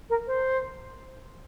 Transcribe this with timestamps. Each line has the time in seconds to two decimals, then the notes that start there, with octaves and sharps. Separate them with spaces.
0.10 A#4
0.27 C5